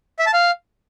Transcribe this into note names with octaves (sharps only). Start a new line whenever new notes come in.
E5
A5
F5